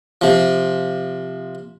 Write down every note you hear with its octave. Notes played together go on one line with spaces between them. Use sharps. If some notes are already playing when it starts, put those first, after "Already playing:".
C3 F3